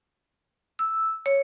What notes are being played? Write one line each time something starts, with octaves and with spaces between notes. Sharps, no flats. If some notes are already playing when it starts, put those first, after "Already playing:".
E6
C#5